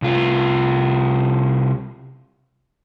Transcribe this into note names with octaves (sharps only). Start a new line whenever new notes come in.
C2 F4